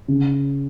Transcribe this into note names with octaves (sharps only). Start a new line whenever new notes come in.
C#3